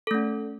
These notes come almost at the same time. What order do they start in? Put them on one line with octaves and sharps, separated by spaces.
A4 A3 C#4